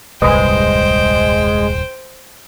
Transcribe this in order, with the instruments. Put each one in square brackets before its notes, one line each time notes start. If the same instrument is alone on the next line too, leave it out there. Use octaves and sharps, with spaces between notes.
[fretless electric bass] D#1 C2 G2 [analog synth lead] G#3 [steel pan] B4 D#5 [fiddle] C5 G5